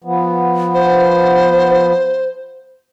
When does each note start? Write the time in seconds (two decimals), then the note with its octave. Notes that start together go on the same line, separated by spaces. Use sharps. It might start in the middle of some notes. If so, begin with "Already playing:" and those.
0.04 F3 B3
0.74 C5